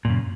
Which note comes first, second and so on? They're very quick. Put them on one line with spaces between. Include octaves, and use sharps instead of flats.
A#2 F#2 C#3